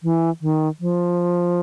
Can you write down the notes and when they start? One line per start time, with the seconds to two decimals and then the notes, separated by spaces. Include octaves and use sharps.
0.03 E3
0.41 D#3
0.80 F3